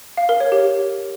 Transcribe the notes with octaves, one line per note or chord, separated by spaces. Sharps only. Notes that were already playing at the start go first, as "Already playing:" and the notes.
F5
A#4
C#5
G4